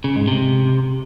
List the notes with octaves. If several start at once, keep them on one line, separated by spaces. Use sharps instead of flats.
C#3
G#2
C3